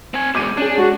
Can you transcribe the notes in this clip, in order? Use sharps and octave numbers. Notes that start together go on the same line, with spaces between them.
C4 G#5
B2 G#3 D6 G6 D#7
C#4 D4 G#4
G#3 F#4